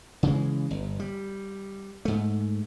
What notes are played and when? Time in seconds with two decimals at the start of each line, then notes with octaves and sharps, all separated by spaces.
0.23 C#3 E3 G#3
0.71 G1
1.00 G3
2.05 G#2 A3